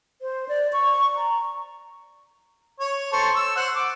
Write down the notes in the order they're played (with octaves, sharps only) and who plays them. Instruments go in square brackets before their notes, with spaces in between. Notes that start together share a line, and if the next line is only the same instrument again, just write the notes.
[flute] C5
D5
C#6
A#5
[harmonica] C#5
A4 C5 C#6
E6
C5 F#5
D6